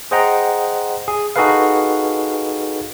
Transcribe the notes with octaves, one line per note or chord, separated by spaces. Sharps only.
G#4 C5 D#5 F#5 G5 A#5
G#4
D#4 F#4 G#4 A4 B4 F5